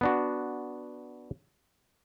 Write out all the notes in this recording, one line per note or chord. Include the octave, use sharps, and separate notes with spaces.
B3 D4 F#4